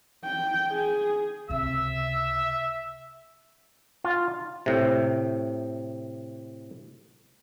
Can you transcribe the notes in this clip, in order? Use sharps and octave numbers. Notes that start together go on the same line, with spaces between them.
G5
G#4
C#2 C3 E5 E6
F4
A2 C3